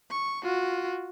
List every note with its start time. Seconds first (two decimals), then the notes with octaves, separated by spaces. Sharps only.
0.11 C#6
0.43 F4 F#4